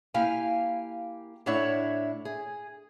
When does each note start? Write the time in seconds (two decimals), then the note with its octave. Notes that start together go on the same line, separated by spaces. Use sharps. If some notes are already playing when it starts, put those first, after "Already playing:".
0.14 A#3 E4 G4 F5 G5 G#5
1.46 A2 D4 E4 C#5 E5 F#5
2.25 G#4